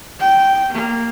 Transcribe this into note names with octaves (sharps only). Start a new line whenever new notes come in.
G5
A#3